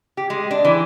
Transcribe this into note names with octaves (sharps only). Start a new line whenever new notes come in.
G4
G#3
D4
E3